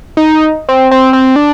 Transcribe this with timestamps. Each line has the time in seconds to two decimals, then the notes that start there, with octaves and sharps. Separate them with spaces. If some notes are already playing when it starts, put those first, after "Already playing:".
0.17 D#4
0.69 C4
0.91 C4
1.13 C4
1.36 D4